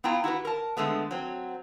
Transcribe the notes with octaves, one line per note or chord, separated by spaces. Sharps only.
B3 E4 F4 G5 A#5
E4 F#4 G4 B4
A#4 A5
D3 G#3 A3 B3
F#3 C4